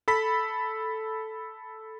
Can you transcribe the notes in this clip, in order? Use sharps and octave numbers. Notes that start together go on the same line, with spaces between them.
A4 B5 B6